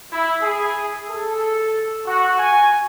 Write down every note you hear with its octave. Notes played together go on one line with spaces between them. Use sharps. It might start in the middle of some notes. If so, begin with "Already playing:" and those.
E4
G#4
A4
F#4
G#5